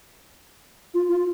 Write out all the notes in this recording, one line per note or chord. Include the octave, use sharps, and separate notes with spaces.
F4
F4